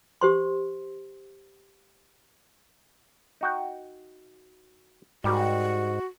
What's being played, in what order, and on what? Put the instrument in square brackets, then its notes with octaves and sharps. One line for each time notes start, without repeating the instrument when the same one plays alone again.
[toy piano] G4 C5 C6
[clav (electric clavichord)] D#4 F#4 G5
[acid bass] G#2 [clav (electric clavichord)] G3 G4 A#4 [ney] F#4